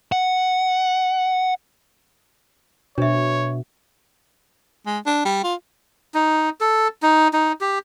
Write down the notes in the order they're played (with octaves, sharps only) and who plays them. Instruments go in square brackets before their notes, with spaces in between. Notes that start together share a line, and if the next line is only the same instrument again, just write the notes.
[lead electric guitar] F#5
[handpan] B2 [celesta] D4 E5 [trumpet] C#5
[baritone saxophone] G#3
D4
G3
F4
[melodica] D#4
A4
D#4
D#4
G4